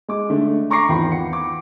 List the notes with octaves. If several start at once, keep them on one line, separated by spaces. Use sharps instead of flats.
G#3 D6
D3 A3
A#5 C#6 D6 A#6 C7
G#1 E2 F4 G5 B5
F#5 C#7
D6